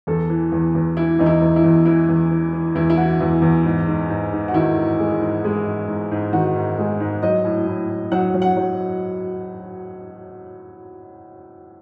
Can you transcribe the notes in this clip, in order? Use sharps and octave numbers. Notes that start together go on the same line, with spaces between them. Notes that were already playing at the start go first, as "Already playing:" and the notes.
E2 A4
E3
E2
E2
E3 E4
E2 D#4
E4
E2
E4
E2
E3 E4
E2
E3
E3
E2 E4
E4
E3 F#4
E2 E4
E2
G#2
G#2
G#2
G#2
F#4
D#3 E4
G#2
G#3
G#2
G#3
G#2
G#2
G#2
D#3 F#4
G#2
G#3
G#2
F#3 D#5
A2
A2
A2
F#3 F#5
F#3
F#5
F#3